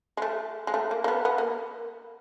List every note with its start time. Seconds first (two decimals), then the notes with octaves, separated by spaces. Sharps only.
0.17 G#3
0.22 A3
0.67 G#3
0.74 A3
0.91 A#3
1.04 A#3
1.08 B3
1.25 B3
1.38 A#3